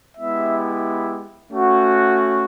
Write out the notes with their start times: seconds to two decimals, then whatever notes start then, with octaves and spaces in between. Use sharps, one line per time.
0.17 G#3 B3 E4 G4 E5
1.51 A3 C#4 F#4